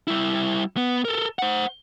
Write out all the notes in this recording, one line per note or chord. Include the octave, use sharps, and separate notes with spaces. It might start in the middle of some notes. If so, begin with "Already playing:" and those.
G3 E4
B3
A4 A#4
C5 F#5